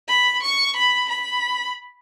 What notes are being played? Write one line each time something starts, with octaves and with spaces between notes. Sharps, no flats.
B5
C#6
B5
B5